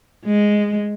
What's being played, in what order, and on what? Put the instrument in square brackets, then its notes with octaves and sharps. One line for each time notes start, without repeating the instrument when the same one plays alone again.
[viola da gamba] G#3